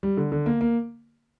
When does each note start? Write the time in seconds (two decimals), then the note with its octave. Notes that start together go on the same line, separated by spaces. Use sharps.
0.03 G3
0.17 D3
0.32 D3
0.46 A#3
0.61 A#3